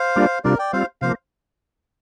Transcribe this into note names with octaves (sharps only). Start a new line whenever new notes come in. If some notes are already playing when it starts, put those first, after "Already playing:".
Already playing: C5 F5
G3 A#3 D4 F4
C3 G3 D4 F4 A#4 D5
D5 G5
G3 C4 F4 C5 F5
C3 F3 A#3 C5 F5